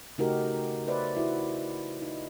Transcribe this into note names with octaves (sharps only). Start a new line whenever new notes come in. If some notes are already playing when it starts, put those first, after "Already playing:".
C#3 A3 D#4 F#4 G4 A#4
B4 C5 D5 E5
E4 F#4
D#4